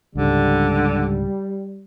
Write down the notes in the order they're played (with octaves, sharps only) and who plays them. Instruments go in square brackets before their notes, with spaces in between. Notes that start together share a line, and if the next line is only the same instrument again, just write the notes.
[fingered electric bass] C#2 G#2 [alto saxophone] D3 [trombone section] G3